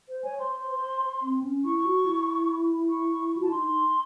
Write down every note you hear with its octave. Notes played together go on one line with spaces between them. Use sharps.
C5
C#5 G#5
C5 C6
C5
C4
C#4
E4 C#6
F#4
E4
C#6
F#4
E4 A5
D#4 C6
D#4